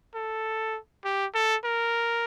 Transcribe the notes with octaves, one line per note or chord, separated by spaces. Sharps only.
A4
G4
A4
A#4